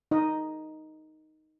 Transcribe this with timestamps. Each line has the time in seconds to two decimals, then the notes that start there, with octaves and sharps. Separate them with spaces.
0.11 D#4 D#5